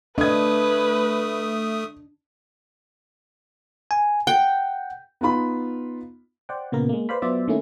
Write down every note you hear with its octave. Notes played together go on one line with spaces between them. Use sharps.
A3 D4 B4 D#5 D#6 G#6
G#5
F#5 G5
B3 D#4 F4 B5
C5 D5 F#5 G5
A#2 C#3 A#3 B3 A#4
G#3 A#3
B4 C5 D5 F5 B5
F#3 B3 F4 C5 D5 E5
D#3 A3 A#3 C#4 E4